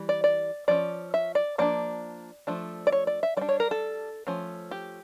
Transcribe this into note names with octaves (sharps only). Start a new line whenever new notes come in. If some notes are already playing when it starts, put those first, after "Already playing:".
Already playing: E3 G3
D5
D5
F3 C#4 D5
E5
D5
F3 A#3 D4 D5
F3 A3 D4
D5
C#5
D5
E5
G3 D4 D5
C#5
A#4
A4
F3 A3 C#4
G4